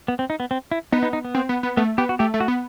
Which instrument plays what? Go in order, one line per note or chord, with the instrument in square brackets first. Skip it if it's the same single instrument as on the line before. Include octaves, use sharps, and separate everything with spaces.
[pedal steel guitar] B3
C4
D#4
B3
C4
E4
[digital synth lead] B3 [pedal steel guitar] D#4
[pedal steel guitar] D#4
D#4
B3
[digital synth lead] C4
B3
B3
[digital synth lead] A3 [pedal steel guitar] B3
[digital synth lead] B3 [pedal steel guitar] G4
[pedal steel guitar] F#4
[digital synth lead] A3 [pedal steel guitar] G4
[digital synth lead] A3
[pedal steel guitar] F#4
[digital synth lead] B3